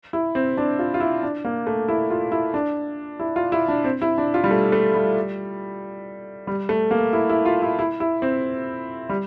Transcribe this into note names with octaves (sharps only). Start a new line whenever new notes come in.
E4
C4
D4
F4
F4
E4
D4
A#3
A3
E4
F4
E4
D4
E4
F4
E4
D4
C4
E4
D4
F4
G3
A3
A3
G3
G3
A3
A#3
E4
E4
F4
E4
E4
E4
C4
G3